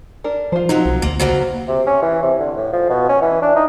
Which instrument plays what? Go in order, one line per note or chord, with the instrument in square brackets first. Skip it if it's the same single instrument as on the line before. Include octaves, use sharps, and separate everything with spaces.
[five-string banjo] D4 A#4
[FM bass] F3 [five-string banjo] F4 C5
[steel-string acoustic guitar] F3 F#3 C4 [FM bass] D#4
[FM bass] B1
[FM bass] D2 [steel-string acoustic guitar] A#3
[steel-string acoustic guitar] C#3 F#3 A#3 [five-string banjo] C5
[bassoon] C3
C#4
E3
C3
D3
A2
F3
B2
C#4
E3
D4
D#4